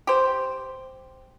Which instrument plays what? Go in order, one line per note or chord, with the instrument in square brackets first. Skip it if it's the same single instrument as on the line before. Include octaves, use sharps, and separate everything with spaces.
[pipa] G4 C5